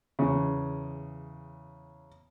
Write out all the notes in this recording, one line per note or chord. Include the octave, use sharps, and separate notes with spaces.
E2 C#3